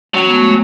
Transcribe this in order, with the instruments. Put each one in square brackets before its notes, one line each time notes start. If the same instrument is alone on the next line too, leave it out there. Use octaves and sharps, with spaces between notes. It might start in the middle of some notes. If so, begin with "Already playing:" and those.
[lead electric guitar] F#3 [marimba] C#4
[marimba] B3
G#3
A3
G#3